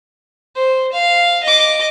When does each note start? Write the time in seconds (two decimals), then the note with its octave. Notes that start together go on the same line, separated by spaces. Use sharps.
0.55 C5
0.93 F5
1.44 D#5 D6